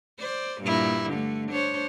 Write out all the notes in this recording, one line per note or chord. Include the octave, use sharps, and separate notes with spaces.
C5 D5
G2 A#2 E4
D3 A3
D4 C5 C#5